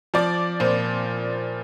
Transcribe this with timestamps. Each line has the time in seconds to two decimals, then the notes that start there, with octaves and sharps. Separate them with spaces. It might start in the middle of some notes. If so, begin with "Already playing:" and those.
0.14 F3 D5
0.60 A#2 C5